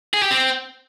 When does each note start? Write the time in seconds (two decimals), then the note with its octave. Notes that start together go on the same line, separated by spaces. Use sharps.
0.14 G#4
0.22 G4
0.31 C4